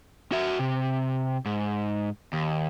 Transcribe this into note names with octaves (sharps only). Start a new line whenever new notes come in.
F#4 E5
C3
G#2
D#2